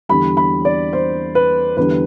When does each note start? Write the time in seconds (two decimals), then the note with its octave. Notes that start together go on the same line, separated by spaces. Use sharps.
0.09 E2 D3 G3 B5
0.37 B5
0.65 D5
0.93 C5
1.35 B4
1.77 E2 D3 G3 B4